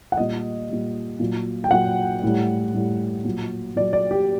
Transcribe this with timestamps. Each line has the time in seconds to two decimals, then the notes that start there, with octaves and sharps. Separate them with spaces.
0.12 F#5
0.18 A#2 G3 D#5
0.69 A#2 G3
1.20 A#2 F#3
1.64 G5
1.71 A#2 F#3 F#5
2.23 A2 G3
2.74 A2 G3
3.25 A#2 F#3
3.76 A#2 D5
3.80 F#3
3.93 D5
4.11 G4